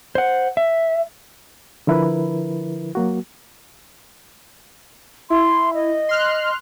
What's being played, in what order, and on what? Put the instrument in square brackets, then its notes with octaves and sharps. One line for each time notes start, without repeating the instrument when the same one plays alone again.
[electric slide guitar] C5 F#5
E5
[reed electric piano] D3 F3 E4 A#4 B4
F#3 A#3 F#4
[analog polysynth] E4 [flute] C6
[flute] D#5
[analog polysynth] C6 F6 F#6